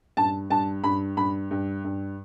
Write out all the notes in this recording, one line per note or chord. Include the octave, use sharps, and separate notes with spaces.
G2 A5
G2 A5
G2 B5
G2 B5
G2
G2